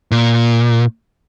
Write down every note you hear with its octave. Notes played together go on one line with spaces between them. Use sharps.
A#2